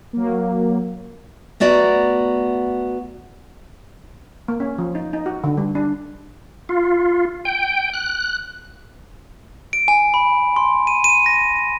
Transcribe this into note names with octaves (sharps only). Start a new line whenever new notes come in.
F#3 A#3
A3 B3 F#4 D5 A#5
A#3
C#4
F3
D#4
D#4
F#4
D3
G3
D4
F4
G5
F#6
D7
G#5
B5
C6
D#7
D#7
A#6